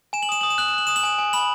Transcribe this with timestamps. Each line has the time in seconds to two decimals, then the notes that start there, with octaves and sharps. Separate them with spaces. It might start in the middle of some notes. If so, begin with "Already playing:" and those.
0.13 G#5 E7
0.23 F#7
0.29 D#6 E7
0.41 D#6 F#7
0.50 E7
0.58 F#6 F#7
0.68 E7
0.73 F#6 F#7
0.87 D#6 E7
0.96 F#7
1.03 G#5 E7
1.18 G#5
1.33 B5 F#7